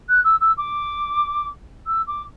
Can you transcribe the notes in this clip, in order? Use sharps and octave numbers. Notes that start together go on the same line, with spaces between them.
F#6
E6
E6
D6
E6
D6